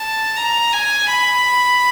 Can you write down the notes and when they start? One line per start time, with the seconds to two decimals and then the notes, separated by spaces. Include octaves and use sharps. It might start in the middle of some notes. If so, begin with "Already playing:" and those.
Already playing: A5
0.36 A#5
0.73 G#5
1.09 B5